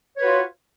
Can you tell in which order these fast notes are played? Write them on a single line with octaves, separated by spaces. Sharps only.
C#5 B4 F#4 F4